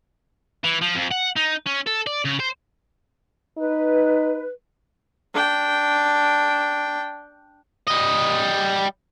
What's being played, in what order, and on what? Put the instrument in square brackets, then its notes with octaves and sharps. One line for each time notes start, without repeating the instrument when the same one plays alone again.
[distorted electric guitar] E3
F3
F2
F#5
D#4
C#4
A4
D5
C#3
C5
[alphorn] D#4 [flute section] B4
[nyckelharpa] D4 G5
[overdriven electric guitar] G3 D#5